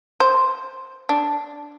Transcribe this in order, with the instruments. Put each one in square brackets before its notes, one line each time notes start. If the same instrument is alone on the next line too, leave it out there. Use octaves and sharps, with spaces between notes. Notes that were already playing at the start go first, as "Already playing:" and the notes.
[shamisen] C5
D4